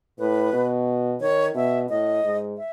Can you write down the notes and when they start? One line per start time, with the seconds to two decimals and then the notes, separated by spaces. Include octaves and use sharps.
0.19 A2 B4
0.53 B2
1.21 D#3 C#5
1.54 B2 E5
1.89 A2 D#5
2.24 G#2
2.57 E5